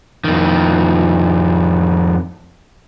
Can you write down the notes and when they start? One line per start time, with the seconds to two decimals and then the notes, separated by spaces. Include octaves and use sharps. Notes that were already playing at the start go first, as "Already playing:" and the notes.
0.24 F2 D#3